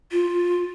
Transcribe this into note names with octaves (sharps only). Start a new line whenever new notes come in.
F4